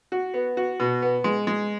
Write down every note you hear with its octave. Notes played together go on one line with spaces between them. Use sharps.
F#4
B3
F#4
B2
B3
G#3
G#3